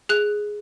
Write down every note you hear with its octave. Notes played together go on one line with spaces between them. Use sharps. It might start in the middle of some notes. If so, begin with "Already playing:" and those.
G#4 F#6